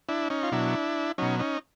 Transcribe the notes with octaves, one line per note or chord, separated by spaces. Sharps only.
D4 E4
C#4 D#4
F4
B2 F#3 D4 E4
B2 F#3 C#4 D#4
C#4 D#4